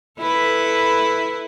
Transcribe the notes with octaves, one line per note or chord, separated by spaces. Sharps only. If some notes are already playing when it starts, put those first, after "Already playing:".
E4 A4 B4